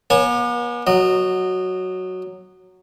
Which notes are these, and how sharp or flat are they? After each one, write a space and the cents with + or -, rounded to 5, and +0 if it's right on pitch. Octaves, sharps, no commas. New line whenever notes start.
B3 -45 C#5 +0 G#5 +0
F#3 +0 D#5 -20